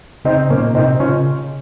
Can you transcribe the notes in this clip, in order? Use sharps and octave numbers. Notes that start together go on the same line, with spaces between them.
C#3 C4 D#4
A#2 A#3 C#4
C3 C4 D#4
C#3 C#4 F4